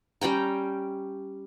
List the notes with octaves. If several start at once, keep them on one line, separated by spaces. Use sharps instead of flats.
G3 C#4 G5 A#5